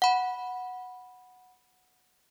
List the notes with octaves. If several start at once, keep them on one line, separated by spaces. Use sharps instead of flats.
F#5 B5